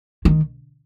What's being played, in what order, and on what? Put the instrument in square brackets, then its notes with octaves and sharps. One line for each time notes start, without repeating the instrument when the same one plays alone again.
[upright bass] D#3